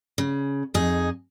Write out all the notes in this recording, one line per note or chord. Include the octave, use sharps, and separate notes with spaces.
C#3
F2 D#4 G#4